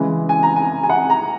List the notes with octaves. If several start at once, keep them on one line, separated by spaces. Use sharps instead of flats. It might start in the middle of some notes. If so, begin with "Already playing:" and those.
Already playing: C#3 E3 G#3
G#5
A#5
G#5
G#5
F#5
A#5